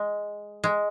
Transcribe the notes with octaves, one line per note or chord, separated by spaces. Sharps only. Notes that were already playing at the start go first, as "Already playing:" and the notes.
Already playing: G#3
G#3